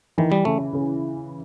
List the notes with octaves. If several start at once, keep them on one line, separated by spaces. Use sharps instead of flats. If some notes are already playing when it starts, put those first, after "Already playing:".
D#3 E3
G3
C#3 A3
C#3